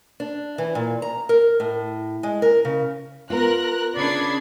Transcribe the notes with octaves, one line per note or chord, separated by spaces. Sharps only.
D4
E3
A#2
A#5
A#4
A2
G#3
A#4
C#3
B3 F4 A#4 F#6 A#6
C#3 D4 D5 B5 G#6 C7